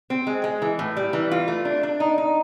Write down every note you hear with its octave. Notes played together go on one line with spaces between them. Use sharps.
C4
G#3
G#3
E3
A2
G3
E3
F4
A3
D4
D4
D#4
D#4